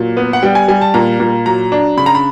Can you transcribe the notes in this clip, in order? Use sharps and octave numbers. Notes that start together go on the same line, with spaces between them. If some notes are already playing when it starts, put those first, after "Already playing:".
Already playing: A#2 F#3
B3
F#5
G3 G5
G#5
G3 G#5
A5
A#2 A#5
A#2
F#3 A#5
D4
C#3 B5
A#5
B5